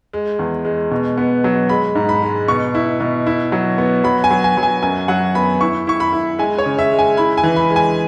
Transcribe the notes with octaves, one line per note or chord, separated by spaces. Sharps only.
G#3
E2
G#3
B2
B3
F#3
G#3 B5
G#2
B5
G#3
B2 C#6
E4
B2
E4
F#3
B3
F#3 B5
G#5
F#3
G#5
F#3
G#5
F#2 G#5
F#3 F#5
B3 B5
E4 C#6
E4 C#6
B5
E4
G#3 G#5
C#5
C#3
E5
G#3
G#5
E4 B5
G#5
E3
B5
G#3
G#5